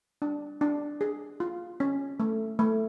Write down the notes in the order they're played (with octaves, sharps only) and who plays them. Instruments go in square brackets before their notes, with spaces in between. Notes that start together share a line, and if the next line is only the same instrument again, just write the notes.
[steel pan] D4
D4
G#4
F4
C#4
A3
A3